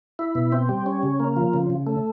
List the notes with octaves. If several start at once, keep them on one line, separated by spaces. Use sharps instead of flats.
E4
B2
C4
G3
C#4
C#3
A#3
F3
C#3
C#3
A3